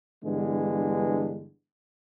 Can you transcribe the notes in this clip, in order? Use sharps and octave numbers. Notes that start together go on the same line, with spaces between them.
G2 D3 E3 G#3 B3